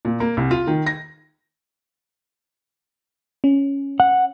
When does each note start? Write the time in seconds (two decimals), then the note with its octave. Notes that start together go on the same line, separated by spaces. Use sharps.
0.05 A#2
0.20 A#3
0.37 C2
0.51 F4
0.67 D#3
0.86 A#6
3.44 C#4
4.00 F#5